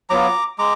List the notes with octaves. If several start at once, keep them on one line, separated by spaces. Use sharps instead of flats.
F#3 B3 F4 A#5 D6
G#3 A#5 D6